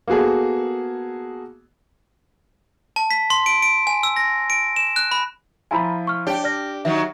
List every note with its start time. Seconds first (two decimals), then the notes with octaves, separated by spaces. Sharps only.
0.08 A#3 B3 F#4 G#4 A4
2.96 A5
3.11 B6
3.30 C6
3.46 D7
3.62 D7
3.87 G#5
4.03 E6
4.16 A#6
4.50 D7
4.76 E7
4.96 F#6
5.11 B5
5.71 F3 E4 F4 G#5 A#5 B5
6.07 C#6 F6
6.27 D4 G4 C#5 G5
6.44 D5 F6 A#6
6.85 D#3 F#3 E5